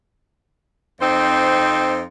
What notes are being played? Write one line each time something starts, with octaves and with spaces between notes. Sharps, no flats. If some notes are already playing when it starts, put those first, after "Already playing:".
F2 C4 D#4 C5